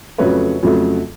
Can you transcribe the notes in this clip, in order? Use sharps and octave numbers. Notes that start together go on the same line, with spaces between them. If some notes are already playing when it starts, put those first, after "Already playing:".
F2 C#3 F#3 A3 B4 C#5
F2 C#3 F#3 A3